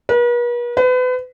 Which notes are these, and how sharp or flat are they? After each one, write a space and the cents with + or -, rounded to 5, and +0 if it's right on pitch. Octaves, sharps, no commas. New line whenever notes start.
B4 -45
B4 +35